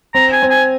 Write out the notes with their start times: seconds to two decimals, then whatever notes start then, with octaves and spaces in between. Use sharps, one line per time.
0.14 C4 A#5
0.33 G#5
0.42 C4
0.51 G#5